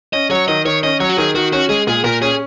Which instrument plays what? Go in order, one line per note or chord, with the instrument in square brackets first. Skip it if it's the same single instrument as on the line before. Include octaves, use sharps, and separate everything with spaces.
[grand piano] C#4 [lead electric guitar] D#5
[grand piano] F#3 [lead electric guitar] C#5
[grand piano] D#3 [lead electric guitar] D#5
[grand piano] D#3 [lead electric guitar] C#5
[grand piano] C#4 [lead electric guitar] D#5
[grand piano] F#3 [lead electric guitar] C#5
[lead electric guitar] F#4
[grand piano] D#3 [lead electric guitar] G#4
[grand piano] D#3 [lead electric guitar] F#4
[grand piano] C#4 [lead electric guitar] F#4
[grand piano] G#3 [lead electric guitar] G#4
[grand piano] A#2 [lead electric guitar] G#4
[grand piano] A#2 [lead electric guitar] A#4
[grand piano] C#4 [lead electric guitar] G#4